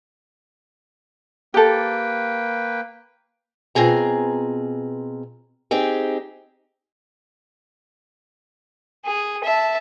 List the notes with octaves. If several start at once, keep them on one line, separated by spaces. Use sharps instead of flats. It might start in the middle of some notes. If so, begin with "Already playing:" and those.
A#3 G4 A4 B4 G5
B2 C4 F4 G#4 A#5
C4 D#4 G4 G#4
G#4
E5 A5